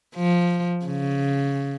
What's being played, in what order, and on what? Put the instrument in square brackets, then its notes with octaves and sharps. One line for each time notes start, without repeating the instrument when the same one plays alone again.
[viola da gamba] F3
C#3